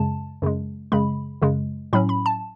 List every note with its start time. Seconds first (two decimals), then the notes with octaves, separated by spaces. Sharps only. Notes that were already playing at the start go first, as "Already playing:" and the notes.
Already playing: F#2 C#3 G#3 A5
0.42 F#2 C#3 G#3
0.92 F#2 C#3 G#3 B5
1.42 F#2 C#3 G#3
1.93 A2 F#3 C#4 B5
2.09 B5
2.26 A5